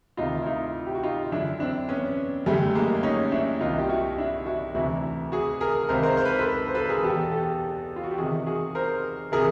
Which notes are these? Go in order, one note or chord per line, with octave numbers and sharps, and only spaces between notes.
D2 C3 D#3 D#4 F4
E4
D#4 F4
G4
F#4
D#4 F4
F#2 D3 D4 E4
C4 D4
B3 C#4
F#2 D3 G3 A3
G#3 A#3
C#4 D#4
D4 E4
C2 C3 D#3 D#4 F4
G4
E4 F#4
D4 E4
E4 F#4
D2 C3 E3 E4 F#4
F#4 G#4
G#4 A#4
C#2 C3 D#3 A#4 C5
A#4 C5
C5
B4
A#4
A4 B4
C5
A4 B4
G#4 A#4
E2 B2 G4 A4
G4 A4
F4
F#4
G4
E2 C3 D#3 F#4 G#4
F#4 G#4
A#4 C5
C3 E3 G#4 A#4